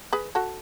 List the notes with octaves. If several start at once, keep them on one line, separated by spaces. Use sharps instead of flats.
G#4 B4
F#4 A4